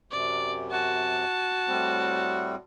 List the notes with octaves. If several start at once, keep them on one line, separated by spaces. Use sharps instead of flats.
F#2 C3 D5
F#4 A5
A2 G3 C4